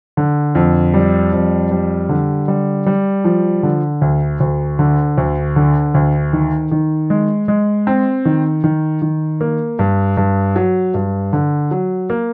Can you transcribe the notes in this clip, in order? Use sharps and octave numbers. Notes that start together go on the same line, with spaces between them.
D3
F2
G3
F2
G3
D3
G3
G3
F3
D3
D2
D2
D3
D2
D3
D2
D#3
D#3
G#3
G#3
C4
D#3
D#3
D#3
A#3
G2
G2
F#3
G2
D3
F#3
A#3